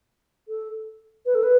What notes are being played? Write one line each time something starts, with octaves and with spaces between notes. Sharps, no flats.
A4
B4
A4
B4